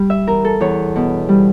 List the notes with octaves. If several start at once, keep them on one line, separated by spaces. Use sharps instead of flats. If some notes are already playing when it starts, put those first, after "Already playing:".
Already playing: G3
E5
E2 A#4
A4
E2 C#5
B2
G3